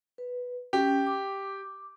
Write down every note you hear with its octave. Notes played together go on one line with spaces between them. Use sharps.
B4
C#4 G4
D6